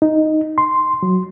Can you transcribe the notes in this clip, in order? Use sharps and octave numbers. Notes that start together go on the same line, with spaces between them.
D#4
C6
F#3